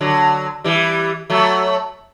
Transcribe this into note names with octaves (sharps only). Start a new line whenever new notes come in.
D3 F#3
E3 G3
F#3 A3